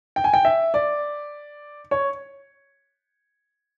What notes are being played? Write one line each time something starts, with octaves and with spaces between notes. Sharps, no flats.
G5
G#5
G5
E5
D5
C#5